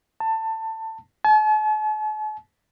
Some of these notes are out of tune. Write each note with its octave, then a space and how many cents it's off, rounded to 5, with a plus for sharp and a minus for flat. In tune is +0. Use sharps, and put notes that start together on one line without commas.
A5 +20
A5 -45